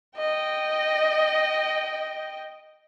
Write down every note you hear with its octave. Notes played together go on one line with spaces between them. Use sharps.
D#5 G5